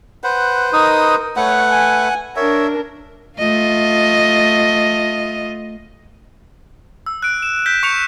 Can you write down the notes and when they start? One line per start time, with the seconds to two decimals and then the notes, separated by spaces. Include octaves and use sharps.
0.24 B4 C5 F#5
0.73 D#4 A#4 D#6
1.36 A3 B4 C#5 F#5
1.70 G#5
2.36 D4 A#4 C#5 E5
3.39 A3 F4 D#5
7.06 E6
7.22 F#6 D7
7.42 E7
7.66 F6 G6 B6
7.83 C#6 C#7 F7